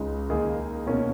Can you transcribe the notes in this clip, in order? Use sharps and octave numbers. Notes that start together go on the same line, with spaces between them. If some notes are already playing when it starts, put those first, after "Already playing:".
Already playing: C#2 C#3 G#3 D#4
D#2 D#3 A#3 D#4 G#4
B2 A#3 C#4